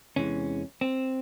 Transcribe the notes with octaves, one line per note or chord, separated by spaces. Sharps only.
E2 C3 E3 G#3 C#4
C4